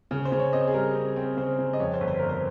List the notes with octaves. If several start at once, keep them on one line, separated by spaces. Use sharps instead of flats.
C#3
C5
C#3
C#5
C4 D#5
G#4
G3 A#4
C4
C4
C#3 C5
C#3
D#5
F2 C#5
C5
G1
C5
G1 A#4
C5